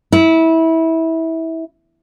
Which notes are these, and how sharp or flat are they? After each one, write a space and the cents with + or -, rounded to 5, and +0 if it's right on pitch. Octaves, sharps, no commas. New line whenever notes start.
E4 -20